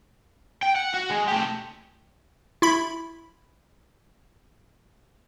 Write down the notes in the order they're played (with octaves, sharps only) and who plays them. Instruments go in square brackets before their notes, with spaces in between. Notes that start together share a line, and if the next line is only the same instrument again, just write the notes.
[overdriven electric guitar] G5
F#5
F#4
G#3
A3 G4
[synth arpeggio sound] E4 B5